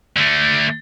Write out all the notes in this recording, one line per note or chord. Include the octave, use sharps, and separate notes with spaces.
D3 A3